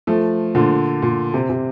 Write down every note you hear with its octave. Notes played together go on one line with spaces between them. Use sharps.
F3 A3
A#2 D3
A#2
C3
C3